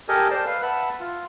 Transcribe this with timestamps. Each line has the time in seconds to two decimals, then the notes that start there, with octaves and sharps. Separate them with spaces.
0.09 G4 A4 A#4 D#5 G#5
0.31 C5 D5 A5 C6
0.46 B4 F5
0.62 B4 E5 F#5 A5 B5
1.00 F4